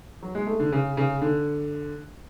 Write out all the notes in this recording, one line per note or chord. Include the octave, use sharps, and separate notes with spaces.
F#3
G#3
A3
D3
C#3
C#3
D3